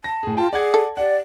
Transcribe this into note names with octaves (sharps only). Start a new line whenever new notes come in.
A5 A#6
A2 G#4
F4 G5 A5
G#4 D5 F#5 G#6
A4
G4 D5 F#5